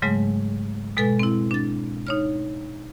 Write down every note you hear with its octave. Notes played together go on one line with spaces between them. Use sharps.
G#2 C#3 F#3 G#3 A3
B2 G#3 A4 B4 G#5
C4 E4
D4 A6
D#4 C#5 F6